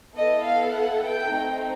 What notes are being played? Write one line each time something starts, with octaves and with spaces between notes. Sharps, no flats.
B3 E4 A4 D#5
F5
F#5
G5
A3 C4 D#4